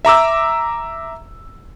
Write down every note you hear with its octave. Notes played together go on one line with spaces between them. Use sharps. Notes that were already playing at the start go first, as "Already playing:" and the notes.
E5 A#5 D6 E6